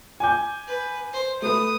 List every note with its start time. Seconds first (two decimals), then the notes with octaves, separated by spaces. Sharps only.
0.20 G#5 D6 G6
0.67 B4
1.13 C5
1.42 A3 B4 D#6